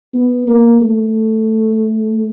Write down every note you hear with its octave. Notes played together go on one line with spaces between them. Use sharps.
B3
A#3
A3